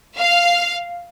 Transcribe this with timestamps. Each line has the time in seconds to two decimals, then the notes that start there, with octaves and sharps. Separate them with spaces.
0.17 F5